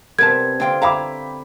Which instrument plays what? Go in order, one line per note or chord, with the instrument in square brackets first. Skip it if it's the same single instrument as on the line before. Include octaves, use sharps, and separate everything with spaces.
[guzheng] C3 G3 B3 [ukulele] A#4 B4 A5 [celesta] G#6
[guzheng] D3 C4 F4 [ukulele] D4 G5
[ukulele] E4 F5 A#5 [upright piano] G5 B5 D6